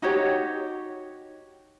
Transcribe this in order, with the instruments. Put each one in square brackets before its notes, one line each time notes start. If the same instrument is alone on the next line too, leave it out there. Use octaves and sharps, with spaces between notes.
[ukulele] D#4 F#4 G4 C#5